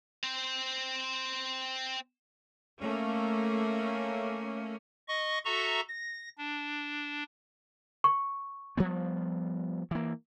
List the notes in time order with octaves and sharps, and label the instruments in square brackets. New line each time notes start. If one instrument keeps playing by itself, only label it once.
[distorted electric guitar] C4 C5
[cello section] A3 A#3 C#4
[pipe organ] D#5 C#6
F#4 A4 E5 A#5 C#6
A#6
D4
[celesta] C#6
[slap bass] F3 G3 B3
E3 A#3